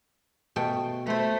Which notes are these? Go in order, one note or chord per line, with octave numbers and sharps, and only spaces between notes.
B2 A3 G5
A3 B4 C5